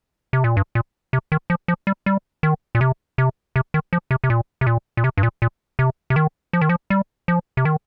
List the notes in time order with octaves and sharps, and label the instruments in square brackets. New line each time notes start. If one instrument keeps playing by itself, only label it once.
[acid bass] C3
A#2
G2
A#2
C3
D#3
F3
F3
G3
G3
D#3
A#2
C3
C3
C3
D#3
F3
C3
C3
A#2
C3
A#2
A#2
C3
G2
A#2
A#2
C3
C3
D#3
F3
D#3
F3
G3
F3
C3
D#3